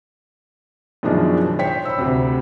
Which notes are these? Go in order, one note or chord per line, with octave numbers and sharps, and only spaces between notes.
F#2 B2 D#3 F3 G#3 D4
C5 C#5 G5 B6
B5 E6
D2 C3